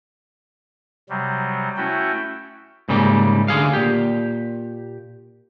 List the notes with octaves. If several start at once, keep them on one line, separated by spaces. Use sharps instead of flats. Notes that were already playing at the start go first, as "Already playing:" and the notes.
C3 F#3 G3
A3 C#4 E4 F#4 G5
G#2 C#3 G3 A#3
D2 D3 G#4 F5
A#2 G4